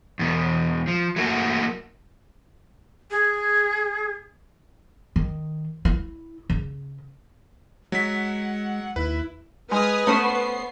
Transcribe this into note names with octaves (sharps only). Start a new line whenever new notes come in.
E2 B2
F3
F#3 A3 A#3 F#4
G#4
D#3
E4
C#3
F#3 G#3 F#5 B6
D#2 E4 B4
G#3 B4 G#5 D#6 F6
A3 B3 C#4 C5 C7